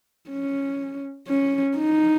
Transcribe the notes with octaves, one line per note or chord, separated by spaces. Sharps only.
C#4
C#4
D#4